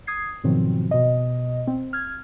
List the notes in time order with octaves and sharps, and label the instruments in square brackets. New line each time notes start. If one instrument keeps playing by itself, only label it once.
[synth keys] D#6 G#6 C7
G#2 B2 D#3 F3 F#3 C4
B2 D#5
C4
F6 G#6